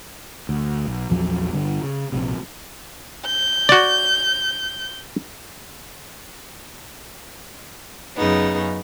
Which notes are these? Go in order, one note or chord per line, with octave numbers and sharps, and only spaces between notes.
D2
B1
A#1 E2 F3 F#3
G1 D3 G3
C#3
A#1 C3
G6
F#4 D5
F#2 C#3 B3 D#4